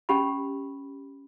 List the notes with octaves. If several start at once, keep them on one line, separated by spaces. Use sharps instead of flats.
C#4 G4 B5